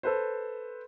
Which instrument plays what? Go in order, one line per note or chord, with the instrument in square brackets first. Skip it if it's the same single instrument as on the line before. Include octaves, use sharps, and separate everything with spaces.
[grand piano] A4 B4 C5